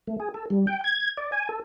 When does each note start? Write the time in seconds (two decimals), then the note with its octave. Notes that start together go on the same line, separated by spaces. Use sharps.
0.07 A3
0.20 G#4
0.34 A4
0.50 G3
0.67 G5
0.84 G#6
1.17 D5
1.32 G#5
1.49 A4